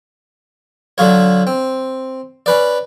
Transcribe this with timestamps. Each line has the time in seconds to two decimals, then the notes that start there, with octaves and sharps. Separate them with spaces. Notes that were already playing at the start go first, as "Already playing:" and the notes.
0.98 D3 F#3 F4 C#5
1.47 C4
2.46 C#4 B4 D5